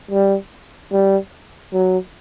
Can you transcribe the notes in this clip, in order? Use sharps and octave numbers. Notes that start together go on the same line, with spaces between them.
G3
G3
F#3